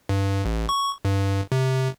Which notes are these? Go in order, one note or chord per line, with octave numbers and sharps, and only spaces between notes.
G2
A1
C#6
G2
C3